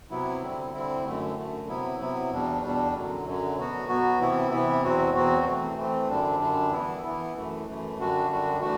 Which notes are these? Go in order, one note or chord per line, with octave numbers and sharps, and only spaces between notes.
C3 F#3 B3 E4
D3 G3 C4 E4
D3 G3 C4 E4
F#2 D3 A3
F#2 D3 A3
C3 F#3 B3 E4
C3 F#3 B3 E4
E2 B2 G3 D4
E2 B2 G3 D4
F#2 D3 F#3
F#2 D3 F#3
B2 F#3 B3 F#4
B2 F#3 B3 F#4
C3 E3 B3 E4
C3 E3 B3 E4
E2 B2 F#3 C4 F#4
E2 B2 F#3 C4 F#4
E3 A3 C4
E3 A3 C4
F#2 D3 G3 D4
F#2 D3 G3 D4
E3 B3 E4
E3 B3 E4
F#2 E3 A3
F#2 E3 A3
F#2 D3 G3 D4 F#4
F#2 D3 G3 D4 F#4
E3 A3 D4 F#4